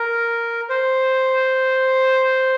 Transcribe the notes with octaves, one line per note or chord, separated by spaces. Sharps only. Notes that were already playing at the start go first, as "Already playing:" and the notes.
Already playing: A#4
C5